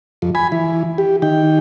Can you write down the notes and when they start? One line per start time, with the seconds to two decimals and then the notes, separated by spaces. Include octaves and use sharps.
0.22 F2
0.35 G#5 B5
0.52 E3
0.98 G4
1.22 D#3 G5